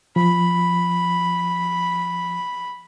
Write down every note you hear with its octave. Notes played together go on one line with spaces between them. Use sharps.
F3 B5